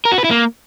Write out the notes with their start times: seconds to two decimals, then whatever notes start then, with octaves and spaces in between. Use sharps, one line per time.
0.05 A#4
0.12 F#4
0.18 B4
0.24 E4
0.31 A#3